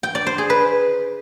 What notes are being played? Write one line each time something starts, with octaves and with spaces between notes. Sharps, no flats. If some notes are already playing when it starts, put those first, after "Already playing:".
G5
D5
C5
G#4
B4